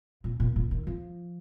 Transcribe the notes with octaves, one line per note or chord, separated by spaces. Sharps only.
A#2
A#2
A#2
D#3
F3